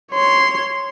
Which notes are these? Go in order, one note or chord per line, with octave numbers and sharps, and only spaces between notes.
C#5 C6